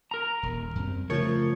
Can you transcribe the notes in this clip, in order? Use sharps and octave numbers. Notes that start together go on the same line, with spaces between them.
A#4 A#5
D#1
F#2 G3 C4
C#3 F3 A3 A#4 C#5